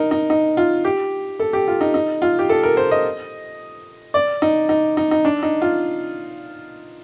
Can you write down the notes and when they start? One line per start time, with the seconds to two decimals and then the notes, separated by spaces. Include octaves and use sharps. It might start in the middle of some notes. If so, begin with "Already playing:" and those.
Already playing: D#4 A#4
0.11 D#4
0.30 D#4
0.57 F4
0.85 G4
1.40 A4
1.53 G4
1.68 F4
1.81 D#4
1.94 D#4
2.22 F4
2.39 G4
2.49 A4
2.63 A#4
2.77 C5
2.91 D#5
4.14 D5
4.42 D#4
4.69 D#4
4.97 D#4
5.11 D#4
5.25 D4
5.43 D#4
5.62 F4